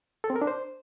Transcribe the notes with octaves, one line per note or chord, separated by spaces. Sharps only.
A4
C4
A#4
D4
C5